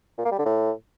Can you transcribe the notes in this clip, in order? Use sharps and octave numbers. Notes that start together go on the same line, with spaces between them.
A#2
A#3
G3
D3
A2